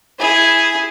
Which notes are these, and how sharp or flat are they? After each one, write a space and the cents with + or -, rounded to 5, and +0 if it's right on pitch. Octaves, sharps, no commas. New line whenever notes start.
E4 +0 G#4 +0